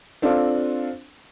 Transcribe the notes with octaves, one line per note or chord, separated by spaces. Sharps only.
C4 D4 F4 A4